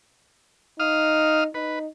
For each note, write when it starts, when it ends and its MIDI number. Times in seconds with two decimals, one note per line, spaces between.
0.80 1.47 63
0.80 1.44 77
0.80 1.44 87
0.80 1.44 89
1.54 1.87 63
1.54 1.79 71